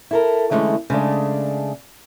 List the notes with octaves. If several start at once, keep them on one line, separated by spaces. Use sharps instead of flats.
E4 A4 A#4
D3 E3 F#3 G#3 A3 C#4
C#3 G#3 A3 D4